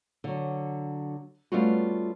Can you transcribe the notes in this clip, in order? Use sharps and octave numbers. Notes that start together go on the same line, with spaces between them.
D3 F#3
G3 A3 B3 C#4 F4 F#4